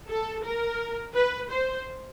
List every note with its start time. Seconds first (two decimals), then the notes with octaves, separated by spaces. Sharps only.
0.10 A4
0.46 A#4
1.15 B4
1.51 C5